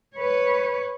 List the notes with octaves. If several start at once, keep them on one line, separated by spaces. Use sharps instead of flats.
B4 C#5